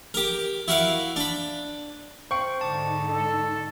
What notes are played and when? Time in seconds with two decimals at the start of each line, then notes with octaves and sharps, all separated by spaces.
0.14 G4 A#4
0.68 E4 F#4 A#4 F5
1.16 D4 B5
2.31 C5 F5 G5 C#6
2.61 G#2 D3 D#4 A5 D6
3.09 A4